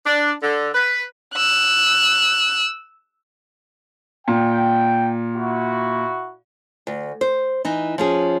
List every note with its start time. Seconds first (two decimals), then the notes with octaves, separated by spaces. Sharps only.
0.05 D4
0.42 D3
0.74 B4
1.35 E6 F#6
4.28 A#2 G5
5.35 E4 F#4
6.87 D2
7.21 C5
7.65 E3 D#4
7.98 F3 C#4 G#4